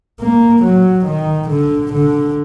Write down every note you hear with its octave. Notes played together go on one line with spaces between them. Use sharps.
A#3
F#3
D#3
D3
D3